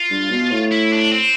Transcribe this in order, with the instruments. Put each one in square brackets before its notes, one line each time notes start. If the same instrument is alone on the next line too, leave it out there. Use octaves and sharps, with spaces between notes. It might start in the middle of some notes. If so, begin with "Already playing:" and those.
Already playing: [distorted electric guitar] F4
[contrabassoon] G2
B2
A2
[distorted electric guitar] E4
D4
C4